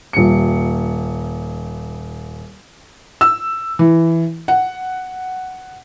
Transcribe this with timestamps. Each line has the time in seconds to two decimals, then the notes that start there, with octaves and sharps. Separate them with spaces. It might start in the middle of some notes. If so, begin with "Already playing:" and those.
0.13 D#1 C#7
3.21 E6
3.79 E3
4.48 F#5